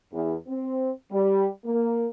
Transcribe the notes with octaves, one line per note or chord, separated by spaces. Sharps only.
E2
C4
G3
A#3